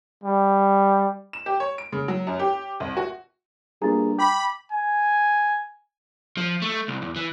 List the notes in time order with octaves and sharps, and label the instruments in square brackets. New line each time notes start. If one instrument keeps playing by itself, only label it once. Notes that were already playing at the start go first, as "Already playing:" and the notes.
[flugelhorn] G3
[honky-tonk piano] E7
G4
C#5
D7
C#3
F#3
F#2
G4
C2
F#4
[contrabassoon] G2 [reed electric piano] A#3 F4 G#4 [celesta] A#5 A6
[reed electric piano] G5 [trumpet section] B5 [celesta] D6
[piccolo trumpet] G#5
[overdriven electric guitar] F3
A3
C2
E2
E3